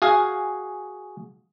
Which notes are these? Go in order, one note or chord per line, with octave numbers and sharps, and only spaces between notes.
F#4 G#4 F5 G#5